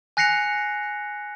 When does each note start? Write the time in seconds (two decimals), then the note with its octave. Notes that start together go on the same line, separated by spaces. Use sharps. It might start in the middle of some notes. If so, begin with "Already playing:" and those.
0.17 G#5 F#6 A#6 C7 C#7 F7